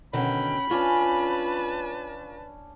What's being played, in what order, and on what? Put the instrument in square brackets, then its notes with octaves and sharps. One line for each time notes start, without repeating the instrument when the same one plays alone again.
[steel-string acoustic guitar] B2 D3 D#3 [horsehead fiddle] C#4 G5 [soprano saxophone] B5
[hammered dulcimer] C#4 D4 C#5 [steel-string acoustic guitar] F4 [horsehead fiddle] B4 A5